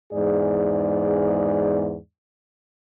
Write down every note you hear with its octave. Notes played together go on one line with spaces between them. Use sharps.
E2 G#2 G#4 D5